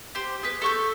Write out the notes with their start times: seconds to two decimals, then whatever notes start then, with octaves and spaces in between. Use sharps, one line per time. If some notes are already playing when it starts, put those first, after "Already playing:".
0.15 G4 C5
0.43 G#4 B4
0.62 A4 C#6 G6